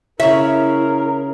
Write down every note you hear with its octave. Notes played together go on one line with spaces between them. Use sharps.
C#3 E4 A#4 C#5 E5